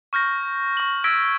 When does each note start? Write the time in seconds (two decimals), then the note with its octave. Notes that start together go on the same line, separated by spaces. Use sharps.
0.13 C#6 F6 G6 A#6
0.77 C#6 F#7
1.04 E6 G#6 A#6 B6 D7